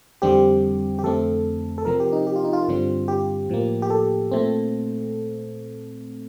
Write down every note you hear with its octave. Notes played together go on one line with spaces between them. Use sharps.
F2 D3 G3 C4 G4
G4
F2 D3 A3 C4 A4
A4
C3 F3 C4 A#4
G4
D#4
G4
F4
D#4
F4
G2 D3 G3 C4
G4
A2 F3 A#3
G4
A4
A#2 A3 C4